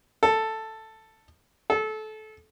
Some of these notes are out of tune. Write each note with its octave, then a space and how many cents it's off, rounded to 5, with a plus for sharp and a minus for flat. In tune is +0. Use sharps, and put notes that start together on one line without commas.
A4 +5
A4 -25